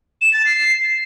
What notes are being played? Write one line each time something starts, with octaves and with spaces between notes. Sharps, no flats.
E7
A6
C7